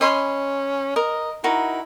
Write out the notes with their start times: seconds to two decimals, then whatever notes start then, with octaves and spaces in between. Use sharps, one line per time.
0.01 C#4 D#5 B5 C6
0.96 A#4 D#5
1.44 D#4 E4 F#4 A#4